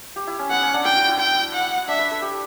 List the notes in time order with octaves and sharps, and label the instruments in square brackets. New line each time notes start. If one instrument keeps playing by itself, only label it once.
[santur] G4
E4
C#4
[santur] B3 [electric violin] F#5
[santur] C#4
D4
[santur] E4 [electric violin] G5
[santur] F#4
E4
[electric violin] G5
F#5
[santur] D4 [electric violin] E5
[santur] B4
A4
G4